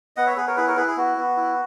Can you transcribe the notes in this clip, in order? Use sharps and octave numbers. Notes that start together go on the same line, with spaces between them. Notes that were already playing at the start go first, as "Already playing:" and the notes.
B3 D#5 F#5
C#5 E5
B3 G#4 B4
A#4 C#5
E4 G#4 B4
A#4 C#5
E4 G#4 B4
G#4
B3 F#4
B3
E4